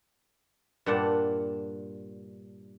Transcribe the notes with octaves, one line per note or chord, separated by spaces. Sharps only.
G2 A#2 F#5 A5